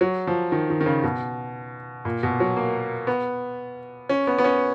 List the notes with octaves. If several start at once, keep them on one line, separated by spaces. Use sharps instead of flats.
F#3
F3
D#3
D#3
D#3
C#3
B2
A#2
B2
F#3
A#3
B3
C#4
B3
B3
C#4